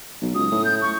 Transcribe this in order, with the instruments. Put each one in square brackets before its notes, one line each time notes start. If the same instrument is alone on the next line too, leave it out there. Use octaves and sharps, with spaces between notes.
[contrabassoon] B1
[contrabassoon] C#2 [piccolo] D#6
[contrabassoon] A2
[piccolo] G6
C#6